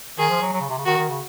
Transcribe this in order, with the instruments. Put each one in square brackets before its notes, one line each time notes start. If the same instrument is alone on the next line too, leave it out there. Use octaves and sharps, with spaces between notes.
[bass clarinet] D#3 [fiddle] G#4
[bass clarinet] F3
F#3
F#3
C#3
C3
C#3
[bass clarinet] D#3 [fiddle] F#4
[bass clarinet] D#3
C#3